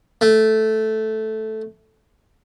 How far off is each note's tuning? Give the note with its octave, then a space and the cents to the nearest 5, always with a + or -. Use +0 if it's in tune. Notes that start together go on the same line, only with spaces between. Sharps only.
A3 -5